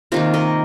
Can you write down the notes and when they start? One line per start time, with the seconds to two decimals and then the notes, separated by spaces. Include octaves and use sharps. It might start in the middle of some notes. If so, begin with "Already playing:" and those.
0.12 C3 D#3 A#3 F4 A#4
0.34 A#4 D#5